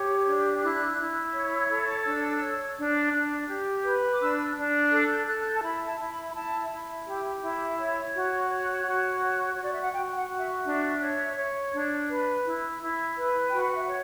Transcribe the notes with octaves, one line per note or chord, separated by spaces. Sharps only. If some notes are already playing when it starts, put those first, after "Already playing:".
Already playing: G4 C#5
D4
E4 F#6
E4
C#5
A4
D4 E6
C#5
D4
D4
G4
B4
D6
D4 E6
D4
A4 F#6
G6
A4 F#6
G6
A5
E4 B5
A5
E4
B5
B5
E4 A5
E4
G4
E4
C#5
F#4
C#5 F#5
F#4
C#5
F#4 C#5
D5
E5
F#5
F#4 G5
F#5
F#4
E5
D4 E5
C#5
C#5
D4
B4
E4
E4
B4
F#4 G5
F#5
E5
C#5 F#5